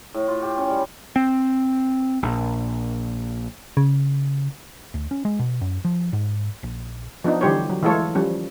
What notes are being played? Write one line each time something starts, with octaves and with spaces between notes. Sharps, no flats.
A2
F4
G4
C#4
G3
C4
A#1
C#3
D2
C#4
G#3
B2
F#2
F3
G#2
A#1
F3 B3 D4 D#4
D3 E3 G3 G4 C5 C#5
F#3
E3 G#3 A3 F4 A4 C#5
F3 G3 C#4